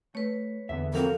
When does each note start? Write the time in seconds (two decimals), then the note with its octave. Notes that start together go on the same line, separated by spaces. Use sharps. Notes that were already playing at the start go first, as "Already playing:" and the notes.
0.15 A3 B4 C#5
0.69 E2 D3 B3 E5
0.94 C2 F2 F3 C4 F#4 A4 A#4 F5